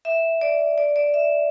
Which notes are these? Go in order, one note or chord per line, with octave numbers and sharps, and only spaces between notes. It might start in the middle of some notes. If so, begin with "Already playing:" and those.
E5
D5
D5
D5
E5